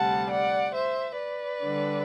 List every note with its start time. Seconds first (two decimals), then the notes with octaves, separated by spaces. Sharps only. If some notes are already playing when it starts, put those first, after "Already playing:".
Already playing: D2 C3 G3 F#5 A5
0.30 D5 F#5
0.75 C5 E5
1.18 B4 D5
1.63 D3 G3 D4